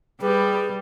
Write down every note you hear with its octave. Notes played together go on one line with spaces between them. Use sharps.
G3 G4 G#4 B4